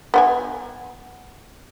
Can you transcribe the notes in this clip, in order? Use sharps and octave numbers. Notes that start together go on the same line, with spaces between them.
B3 C5 G#5